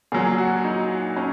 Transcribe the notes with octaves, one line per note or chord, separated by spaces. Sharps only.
A#2 F#3 G#4
F#4
D#4
C#4